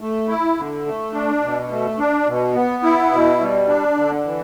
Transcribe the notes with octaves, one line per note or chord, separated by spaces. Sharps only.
A3
E4
D3
A3
D4
B2
A3
D4
B2
B3
E4
B2
G3
D4
D3
E3